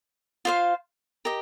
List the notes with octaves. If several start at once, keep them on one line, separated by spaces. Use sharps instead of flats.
F4 C5 F5
G4 A#4 D#5